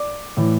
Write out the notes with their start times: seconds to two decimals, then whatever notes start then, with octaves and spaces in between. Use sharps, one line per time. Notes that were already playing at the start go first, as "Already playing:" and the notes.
Already playing: D5 D6
0.37 A2 E3